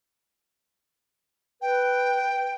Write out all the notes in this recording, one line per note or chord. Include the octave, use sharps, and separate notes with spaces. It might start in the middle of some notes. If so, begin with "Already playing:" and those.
B4 G5